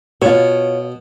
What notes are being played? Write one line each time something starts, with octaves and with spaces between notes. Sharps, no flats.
B2 F4 C#5